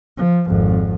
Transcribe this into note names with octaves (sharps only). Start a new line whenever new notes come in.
F3
G#1 F2